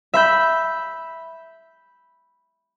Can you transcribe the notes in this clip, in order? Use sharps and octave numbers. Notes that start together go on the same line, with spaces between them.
E5 B5 G6